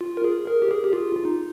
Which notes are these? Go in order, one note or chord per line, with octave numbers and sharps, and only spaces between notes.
F4
A#4
G#4
A#4
G4
G#4
G4
F4
F4
D#4